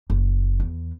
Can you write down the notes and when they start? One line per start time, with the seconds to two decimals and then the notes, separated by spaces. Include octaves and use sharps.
0.10 F#1
0.60 E2